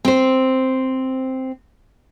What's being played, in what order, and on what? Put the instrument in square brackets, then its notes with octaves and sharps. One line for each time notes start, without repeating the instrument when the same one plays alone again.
[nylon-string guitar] C4 C5